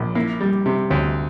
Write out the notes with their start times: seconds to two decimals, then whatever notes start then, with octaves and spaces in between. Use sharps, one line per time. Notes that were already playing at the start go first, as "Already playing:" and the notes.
Already playing: A#1
0.15 A#3 E4
0.41 G3
0.66 C3
0.91 D2